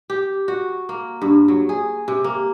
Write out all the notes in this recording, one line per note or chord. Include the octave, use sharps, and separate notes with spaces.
G4
F#4
A#3
G2
F#3
G#4
C3
A#3